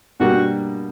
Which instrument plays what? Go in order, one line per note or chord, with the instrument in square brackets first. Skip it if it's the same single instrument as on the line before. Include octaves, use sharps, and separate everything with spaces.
[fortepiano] B2 G3 A#3 D4 [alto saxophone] F#4